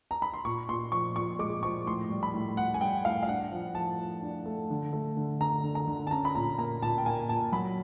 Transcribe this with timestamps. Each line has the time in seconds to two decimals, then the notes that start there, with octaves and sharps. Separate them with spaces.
0.11 A#5
0.22 B5
0.34 C6
0.45 A#2 C#6
0.69 A#2 C6
0.92 F3 C#6
1.16 A#2 C#6
1.39 G#3 D6
1.63 F3 C#6
1.86 A2 C6
2.10 G3
2.23 B5
2.34 A2
2.57 A2 F#5
2.74 G#5
2.81 G3 G5
3.05 A2 F5
3.23 F5
3.28 D4 F#5
3.52 F3
3.75 F3 A5
3.98 F3
4.23 D4
4.46 A3
4.70 D3
4.93 A3
5.17 D3
5.40 D3 A#5
5.64 D3
5.75 A#5
5.87 D3
6.07 A5
6.11 C#4 A#5
6.25 B5
6.35 A#2 A#5
6.58 A#3 A#5
6.82 A#2 A5
6.98 G5
7.06 A#3 G#5
7.29 A#2 A5
7.52 F#3 B5